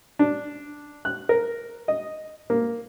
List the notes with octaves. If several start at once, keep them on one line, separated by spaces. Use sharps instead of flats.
D4
F#6
A#4
D#5
A#3